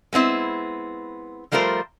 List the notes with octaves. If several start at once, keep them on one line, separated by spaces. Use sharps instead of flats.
G#3 B3 C4 E4
F3 G3 A3 F4 A#4 C5